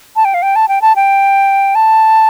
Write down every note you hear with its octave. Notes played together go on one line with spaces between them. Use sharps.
A5
G5
F5
G5
A5
G5
A5
G5
A5